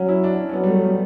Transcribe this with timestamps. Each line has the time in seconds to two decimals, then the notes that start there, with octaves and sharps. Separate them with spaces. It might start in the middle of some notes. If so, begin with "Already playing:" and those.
Already playing: F#3 C#4
0.09 E4
0.24 D4
0.38 C#4
0.49 C#4
0.53 F#3 B3
0.64 G3
0.68 A3
0.84 G3